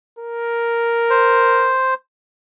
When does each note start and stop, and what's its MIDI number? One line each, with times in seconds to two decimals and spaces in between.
0.19 1.76 70
1.10 1.94 72